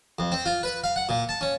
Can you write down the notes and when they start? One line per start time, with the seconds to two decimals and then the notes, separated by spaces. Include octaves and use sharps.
0.19 F2
0.32 C4
0.46 F4
0.63 B4
0.84 F5
0.96 F#5
1.09 A#2
1.29 A5
1.41 C#4